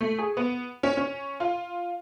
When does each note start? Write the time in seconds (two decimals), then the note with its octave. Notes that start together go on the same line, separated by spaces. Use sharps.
0.01 A3
0.18 G#4
0.37 B3
0.83 C#4
0.97 C#4
1.40 F4